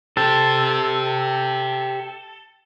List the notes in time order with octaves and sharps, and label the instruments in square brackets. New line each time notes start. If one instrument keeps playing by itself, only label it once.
[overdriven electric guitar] G4 C5 [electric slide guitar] A4